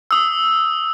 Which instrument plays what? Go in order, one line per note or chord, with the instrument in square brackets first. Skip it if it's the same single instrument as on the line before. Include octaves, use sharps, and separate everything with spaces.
[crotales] D#6 E6